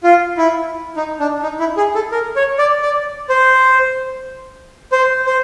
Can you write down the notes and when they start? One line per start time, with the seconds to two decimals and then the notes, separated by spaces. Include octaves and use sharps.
0.03 F4
0.38 E4
0.96 D#4
1.20 D4
1.43 D#4
1.59 E4
1.77 G#4
1.95 A4
2.12 A#4
2.36 C#5
2.58 D5
2.83 D5
3.29 C5
4.92 C5
5.26 C5